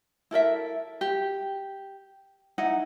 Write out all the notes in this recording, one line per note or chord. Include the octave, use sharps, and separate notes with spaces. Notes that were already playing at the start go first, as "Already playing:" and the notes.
E4 A4 A#4 E5
G4
D#4 E4 F#5